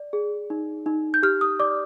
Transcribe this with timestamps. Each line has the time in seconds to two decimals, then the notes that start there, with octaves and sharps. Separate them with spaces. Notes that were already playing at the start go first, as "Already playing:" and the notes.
Already playing: D5
0.13 G#4
0.50 D#4
0.86 D#4
1.14 G6
1.23 G4 F6
1.41 D#6
1.60 D5 D6